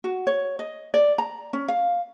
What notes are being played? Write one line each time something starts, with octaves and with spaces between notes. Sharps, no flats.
F#4
C#5
D#5
D5
A#5
C#4
F5